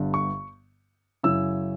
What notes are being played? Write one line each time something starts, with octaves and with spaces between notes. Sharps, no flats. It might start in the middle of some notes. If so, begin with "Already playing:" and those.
Already playing: G1 G2 D3
C#6
F#2 C#3 F#3 C#4 E4 E6